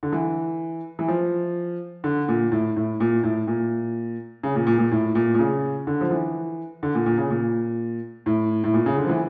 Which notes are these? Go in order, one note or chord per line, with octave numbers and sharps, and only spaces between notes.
D3
E3
E3
F3
D3
A#2
A2
A2
A#2
A2
A#2
C#3
A#2
A#2
A#2
A2
A#2
A#2
C#3
D3
F3
E3
D3
A#2
A#2
C#3
A#2
A2
A2
A#2
C#3
D3
F3
E3